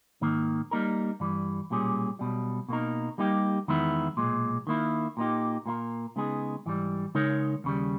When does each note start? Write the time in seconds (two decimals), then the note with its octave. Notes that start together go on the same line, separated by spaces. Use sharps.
0.21 G#2 D#3 A#3
0.71 G3 A#3 D#4 A#4
1.20 G2 E3 G3
1.70 B1 A#2 G3 C#4 G#4
2.19 B1 B2 G3
2.68 B2 A#3 D#4 A#4
3.18 G3 A#3 D#4 G4
3.68 E2 D#3 G#3 B3 E4
4.17 B1 A#2 G#3
4.67 D#3 A#3 E4
5.17 A#2 A#3 D#4 G4
5.66 A#2 A#3 E4 A#4
6.16 C#3 G#3 B3 D#4 G#4
6.66 G#2 E3 G3
7.15 C#3 G#3 D#4 A#4 C#5
7.64 D#2 C#3 G3